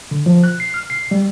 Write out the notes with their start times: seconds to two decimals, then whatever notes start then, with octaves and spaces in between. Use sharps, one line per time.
0.11 D3
0.26 F3
0.43 F#6
0.60 C7
0.74 F6
0.90 C7
1.11 G3